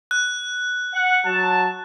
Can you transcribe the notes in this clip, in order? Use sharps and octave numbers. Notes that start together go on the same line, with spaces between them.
F#6
F#5
F#3 A5